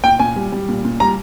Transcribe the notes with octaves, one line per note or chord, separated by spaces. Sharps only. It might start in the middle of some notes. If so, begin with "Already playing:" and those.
A#2 G5
A#2 G#5
G3
G3
A#2
A#2
G3 A#5